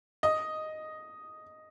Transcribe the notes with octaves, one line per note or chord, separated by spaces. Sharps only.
D#5